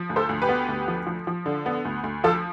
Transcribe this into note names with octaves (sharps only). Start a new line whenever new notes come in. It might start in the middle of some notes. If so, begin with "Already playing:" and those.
Already playing: F3
D2
A4 C5
D2
G4 B4
B3
D2
F3
F3
F3
D3
B3
D2
D2
F3 F4 A4